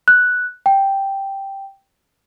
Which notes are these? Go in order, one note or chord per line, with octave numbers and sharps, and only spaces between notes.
F#6
G5